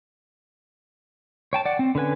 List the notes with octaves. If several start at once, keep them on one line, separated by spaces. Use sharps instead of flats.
C#5 G5 A5
D5 F#5
C4
D3 C#4 B4 G#5